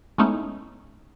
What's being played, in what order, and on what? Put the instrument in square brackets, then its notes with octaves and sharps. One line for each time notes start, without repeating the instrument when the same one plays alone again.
[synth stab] G#3 A3 B3 C#4 D#4 E4